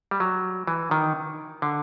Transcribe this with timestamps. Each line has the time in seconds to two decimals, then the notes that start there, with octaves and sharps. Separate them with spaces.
0.11 G3
0.20 F#3
0.67 E3
0.91 D#3
1.62 D3